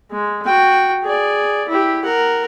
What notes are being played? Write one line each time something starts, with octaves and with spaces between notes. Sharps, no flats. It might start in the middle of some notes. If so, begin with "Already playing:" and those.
G#3
F#4 G5
G#4 D5
E4 G4
A#4 F#5